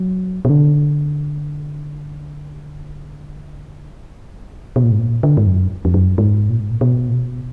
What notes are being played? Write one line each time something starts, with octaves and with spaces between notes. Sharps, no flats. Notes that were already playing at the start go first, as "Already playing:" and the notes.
Already playing: F#3
B2
D3
B2
A#2
G#2
A#2
D3
G#2
F#2
F2
F#2
G#2
A#2
G#2
A#2
B2
A#2
B2